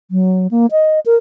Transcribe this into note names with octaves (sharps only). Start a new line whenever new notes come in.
F#3
A#3
D#5
A#4